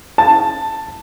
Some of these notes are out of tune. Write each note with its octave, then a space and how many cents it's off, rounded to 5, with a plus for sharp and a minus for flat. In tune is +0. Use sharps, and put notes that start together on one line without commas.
A5 +10